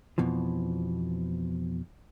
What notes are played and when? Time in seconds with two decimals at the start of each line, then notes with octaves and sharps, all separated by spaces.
0.18 F2 B2 E3 F3